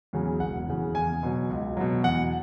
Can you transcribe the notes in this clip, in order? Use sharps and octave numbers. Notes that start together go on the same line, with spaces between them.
E2 C#3 F#3
E1 F#5
E2 C#3 E3
E2 G#5
B2 F#3
C#2
B2 F#3
E2 F#5